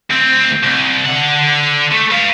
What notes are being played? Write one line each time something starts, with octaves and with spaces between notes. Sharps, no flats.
D2 C4
C2
D3 F#5
A3
B4 F5